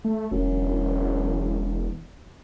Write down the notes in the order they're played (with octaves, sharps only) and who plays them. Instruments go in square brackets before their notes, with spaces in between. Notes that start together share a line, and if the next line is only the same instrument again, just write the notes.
[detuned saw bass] A3
[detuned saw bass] E1 [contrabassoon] F#2